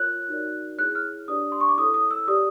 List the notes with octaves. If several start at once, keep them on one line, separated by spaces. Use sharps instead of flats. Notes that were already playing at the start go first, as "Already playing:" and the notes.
Already playing: F4 A#4 C#5 F#6
D#4 F#4 A#4 D5
E4 G#4 C#5 F#6
F6
D4 G4 B4 D5 D#6
C6
C#6
D6
E4 A4 C#5 D#6
D#6
E6
G4 B4 D5 D#6